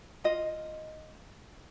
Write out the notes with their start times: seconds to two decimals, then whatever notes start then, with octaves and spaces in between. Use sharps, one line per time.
0.24 F4 D#5